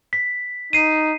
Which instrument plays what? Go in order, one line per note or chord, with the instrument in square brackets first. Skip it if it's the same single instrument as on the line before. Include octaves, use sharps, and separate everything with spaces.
[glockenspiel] B6
[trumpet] D#4 [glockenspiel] C7 D#7